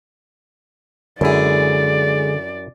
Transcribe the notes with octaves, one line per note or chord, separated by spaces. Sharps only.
F#2 D3 G#3 E4 G#4 D5